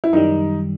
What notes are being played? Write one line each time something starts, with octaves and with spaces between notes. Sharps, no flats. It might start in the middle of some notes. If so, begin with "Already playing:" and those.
E4
F#2 D#3 G3 D#4